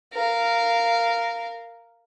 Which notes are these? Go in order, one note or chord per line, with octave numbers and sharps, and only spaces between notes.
A#4 F5